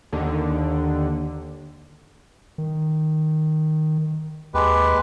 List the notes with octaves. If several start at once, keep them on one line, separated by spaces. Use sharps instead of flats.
D#2 D3
D#3
D#2 G#3 G4 B4